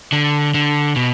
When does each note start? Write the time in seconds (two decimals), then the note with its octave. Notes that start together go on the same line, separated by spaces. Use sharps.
0.12 D3
0.54 D3
0.96 B2